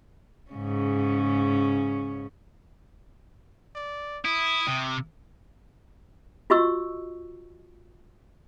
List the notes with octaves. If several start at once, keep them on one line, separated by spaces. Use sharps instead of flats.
G#2 C#3 C#4
D5
E4 D#6
C3
F4 F#4 D#5 C#6 E6